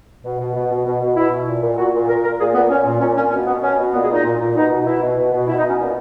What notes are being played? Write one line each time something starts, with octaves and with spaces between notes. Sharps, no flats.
B2
B2
B2
B2
B2
B2
B2 E4
B2
A#2
A#2
A#2 F#4
A#2
A#2 A#4
A#2 A#4
A#2 G#4
A#2 B3
A#2 C#4
A#2
A#2 C#4
A#2 C#4
B2 C#4
B2 B3
B2 C#4
B2
A#2 B3
G#4
A#2
D#4
A#2
A#2
B2 D#4
B2
B2 E4
B2
B2
B2
B2 E4
D#4
B2
C#4
A#2 B3